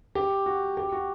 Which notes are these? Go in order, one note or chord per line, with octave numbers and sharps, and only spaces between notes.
G4
F#4
G4
F#4